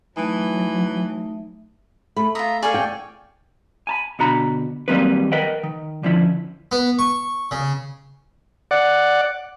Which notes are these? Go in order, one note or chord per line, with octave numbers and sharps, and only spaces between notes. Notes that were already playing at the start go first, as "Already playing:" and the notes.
E3 F#3 A3 D#4 E5
A3 B5
F4 E5 A#5 D#6
G#4 A4 D5 F5 G#5 C#6
G5
G#5 A5 B5
B2 D3 F#4 A#5 B5
D#3 F#3 G3 A#3 C4 B4
A#4 B4 D#5 F#5 G5
D#3
D3 F3 C#4 E4
B3
C#6
C#3
D5 F#5